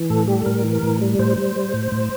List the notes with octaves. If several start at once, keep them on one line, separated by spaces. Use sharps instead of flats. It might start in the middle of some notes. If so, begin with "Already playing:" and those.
Already playing: E3
A2 A4
G3 G4
A4
A2 A#4
E3
A2
G3
A2 C5
G3
G3
A2
A2